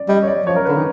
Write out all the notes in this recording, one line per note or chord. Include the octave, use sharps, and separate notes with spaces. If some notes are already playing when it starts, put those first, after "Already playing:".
Already playing: D5
G3 D#5
C#5
D5
F3 C#5
A#4
D3 B4
D#3